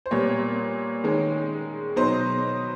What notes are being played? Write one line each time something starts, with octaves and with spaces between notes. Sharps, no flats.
C5
A#2 G3 B3 C#5
D#3 G#3 C#4
B2 F#3 B3 D#4 C5